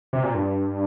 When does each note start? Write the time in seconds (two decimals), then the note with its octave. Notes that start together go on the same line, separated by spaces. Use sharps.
0.13 C3
0.24 A#2
0.34 G2